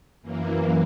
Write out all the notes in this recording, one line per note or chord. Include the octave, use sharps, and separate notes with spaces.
F#2 E3 A#3